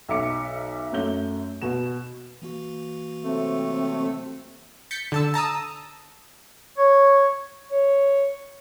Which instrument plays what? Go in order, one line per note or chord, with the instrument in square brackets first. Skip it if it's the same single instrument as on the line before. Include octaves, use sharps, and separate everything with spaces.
[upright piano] B1 E5 D6 C#7
F#2 A3 G6 G7
B2 F#4 E7
[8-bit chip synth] E3 A#3 F#4
[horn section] C3 F#3 A3 [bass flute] C4
[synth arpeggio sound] G6 A6 B6 C#7
D3 A5 E6
A5 A#5 D#6 E6
[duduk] C#5
[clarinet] C#5